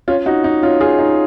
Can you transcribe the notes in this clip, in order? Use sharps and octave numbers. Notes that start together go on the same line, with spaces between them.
C#4 F4
D#4 F#4
D#4
C#4 F4
F4 G#4
D#4